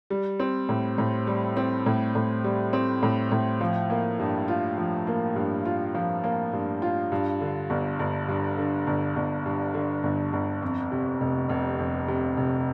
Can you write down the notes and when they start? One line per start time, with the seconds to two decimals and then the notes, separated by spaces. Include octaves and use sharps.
0.10 G3
0.40 C4
0.69 A2
0.98 A2
1.27 G3
1.57 C4
1.86 A2
2.15 A2
2.44 G3
2.73 C4
3.03 A2
3.32 A2
3.61 F3
3.90 A#3
4.19 G2
4.48 F4
4.78 F3
5.07 A#3
5.36 G2
5.65 F4
5.95 F3
6.24 A#3
6.53 G2
6.82 F4
7.12 G2
7.41 D3
7.70 G1
7.99 G1
8.28 G2
8.58 D3
8.87 G1
9.16 G1
9.46 G2
9.74 D3
10.03 G1
10.33 G1
10.62 F2
10.92 C3
11.21 F1
11.49 F1
11.79 F2
12.08 C3
12.37 F1